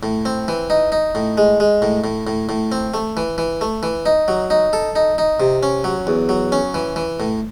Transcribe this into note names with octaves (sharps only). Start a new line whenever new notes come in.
A2
C4
E3
D#4
D#4
A2
G#3
G#3
A2
A2
A2
A2
C4
A3
E3
E3
A3
E3
D#4
F#3
D#4
A4
D#4
D#4
C3
C#4
F#3
E2
F#3
C#4
E3
E3
A2